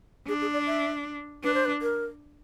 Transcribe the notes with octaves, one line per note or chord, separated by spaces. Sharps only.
D4 G#4
G#4
D5
E5
D4 B4
C5
B4
A#4